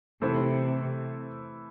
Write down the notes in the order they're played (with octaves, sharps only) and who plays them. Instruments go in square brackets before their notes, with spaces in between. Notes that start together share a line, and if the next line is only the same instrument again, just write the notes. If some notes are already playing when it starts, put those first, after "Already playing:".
[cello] C3 [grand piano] E3 A3 E4 A4 C5